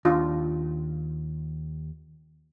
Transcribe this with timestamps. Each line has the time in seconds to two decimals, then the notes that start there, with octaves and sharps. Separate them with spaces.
0.05 D#2 D4 F4